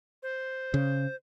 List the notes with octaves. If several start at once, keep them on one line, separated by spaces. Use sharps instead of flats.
C5
C#3